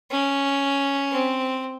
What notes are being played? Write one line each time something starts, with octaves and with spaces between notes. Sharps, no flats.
C#4
C4